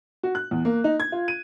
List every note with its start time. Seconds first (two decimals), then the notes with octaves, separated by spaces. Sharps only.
0.23 F#4
0.35 F#6
0.51 E2
0.65 A#3
0.84 D#4
1.00 G#6
1.12 F4
1.28 D#7